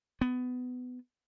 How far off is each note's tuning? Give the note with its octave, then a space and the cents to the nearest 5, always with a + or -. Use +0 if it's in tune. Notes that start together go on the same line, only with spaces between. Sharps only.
B3 +20